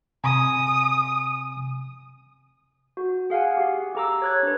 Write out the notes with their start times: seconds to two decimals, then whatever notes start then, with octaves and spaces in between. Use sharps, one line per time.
0.24 C3 G#5 D#6
2.97 F#4
3.30 G#4 F5 F#5 G#5
3.57 G4
3.95 G4 A4 A#5 D6 E6
4.22 C#5 F#6 G#6
4.43 D4 B4